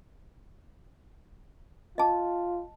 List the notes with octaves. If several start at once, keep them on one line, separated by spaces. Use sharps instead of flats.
F4 D#5 A5